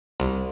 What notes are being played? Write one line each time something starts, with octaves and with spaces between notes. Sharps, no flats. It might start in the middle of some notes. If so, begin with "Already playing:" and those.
C2